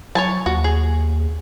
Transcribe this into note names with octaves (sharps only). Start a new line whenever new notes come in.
F#3 C#5 G#5 A5
D#2 F#4
G#4